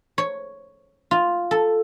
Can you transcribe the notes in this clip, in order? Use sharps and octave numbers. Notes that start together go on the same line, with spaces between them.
C#5
F4
A4